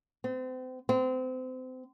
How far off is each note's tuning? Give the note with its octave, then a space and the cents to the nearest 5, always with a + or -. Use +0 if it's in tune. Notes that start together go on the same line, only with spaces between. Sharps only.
C4 -35
C4 -30